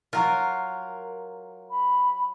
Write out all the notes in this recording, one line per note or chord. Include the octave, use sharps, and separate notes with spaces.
F#3 F4 A#4
B5